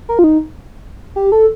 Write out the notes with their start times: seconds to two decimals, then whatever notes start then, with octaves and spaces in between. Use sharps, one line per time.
0.09 A#4
0.19 F4
0.24 D#4
1.16 G4
1.32 A4